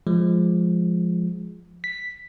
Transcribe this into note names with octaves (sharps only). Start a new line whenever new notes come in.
F3 G#3
B6